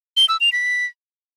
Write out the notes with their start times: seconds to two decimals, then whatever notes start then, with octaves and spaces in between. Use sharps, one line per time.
0.17 G7
0.29 E6
0.41 F7
0.52 B6